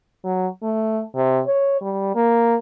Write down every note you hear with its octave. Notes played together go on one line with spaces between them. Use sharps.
F#3
A3
C3
C#5
G3
A#3